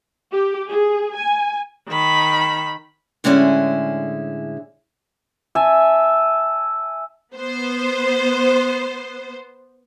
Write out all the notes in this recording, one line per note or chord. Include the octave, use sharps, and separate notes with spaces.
G4
G#4
G#5
D#3 B5
A2 D3 G#3 C#4 E4 G#4
E5 G#5 A5
B3 C5